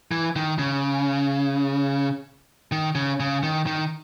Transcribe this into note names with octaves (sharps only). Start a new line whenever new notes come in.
E3
D#3
C#3
D#3
C#3
C#3
D#3
D#3